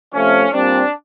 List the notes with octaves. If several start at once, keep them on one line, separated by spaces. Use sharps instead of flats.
C3 F3 A3 C#4
A#2 G3 C4 D4